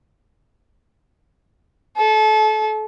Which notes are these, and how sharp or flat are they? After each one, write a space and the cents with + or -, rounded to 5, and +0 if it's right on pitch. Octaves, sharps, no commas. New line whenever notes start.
A4 -30